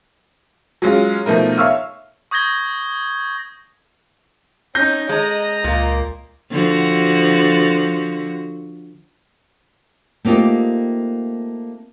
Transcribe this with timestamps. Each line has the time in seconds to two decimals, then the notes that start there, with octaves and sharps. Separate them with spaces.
0.82 F#3 G#3 C#4 F4
1.26 B2 F3 A3 D#4 A#4
1.58 C#5 E5 F5 C#6 E6 F6
2.31 C#6 D#6 G6 G#6 A#6 G7
4.75 C#4 D#4 G6 A#6
5.09 G#3 D#5 A#5
5.64 C#2 A#2 A#3
6.51 D3 F3 F#4
10.25 A3 A#3 C4 D#4 F4 G4